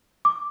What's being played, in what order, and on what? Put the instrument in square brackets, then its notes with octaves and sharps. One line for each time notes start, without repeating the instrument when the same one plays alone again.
[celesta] D6